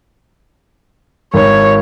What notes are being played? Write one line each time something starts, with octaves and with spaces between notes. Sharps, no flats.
G#1 C#5